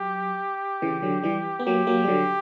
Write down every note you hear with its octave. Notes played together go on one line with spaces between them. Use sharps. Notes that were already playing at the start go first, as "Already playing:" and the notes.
Already playing: F#3 G4
C#3 E3
D3 F#3
E3 G3
B3
F#3 A#3 G4
F#3 A#3
G3
D3 F#3